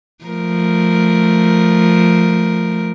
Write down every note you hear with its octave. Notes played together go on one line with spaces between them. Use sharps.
F3 A3 A#4